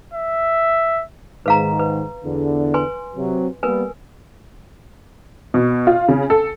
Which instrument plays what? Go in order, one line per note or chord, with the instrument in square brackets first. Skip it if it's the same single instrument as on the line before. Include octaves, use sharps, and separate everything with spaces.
[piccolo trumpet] E5
[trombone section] G#2 D#3 [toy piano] B4 F5 A#5
[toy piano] B4
[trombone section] E2 D3
[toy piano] B4 G#5 C6
[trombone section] C3 F#3
[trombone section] G3 A#3 B3 [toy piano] A#4 B4 G#5
[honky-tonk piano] B2
F4
C#3
A4